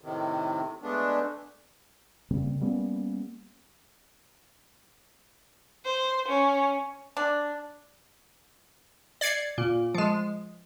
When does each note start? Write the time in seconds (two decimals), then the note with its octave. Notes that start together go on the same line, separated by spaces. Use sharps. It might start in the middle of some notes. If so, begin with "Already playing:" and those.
0.01 A2 C3 D#3
0.83 G#3 A3 B3 D4
2.31 C#3 G3 A#3 C4
2.61 G3 A#3 B3 C#4
5.85 C5
6.28 C#4
7.17 D4
9.21 D5 G#6 C7 C#7
9.58 A#2
9.94 F3 G#3